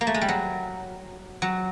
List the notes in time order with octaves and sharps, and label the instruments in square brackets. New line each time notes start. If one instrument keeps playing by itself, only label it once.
[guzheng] A#3
A3
G#3
G3
F#3
F#3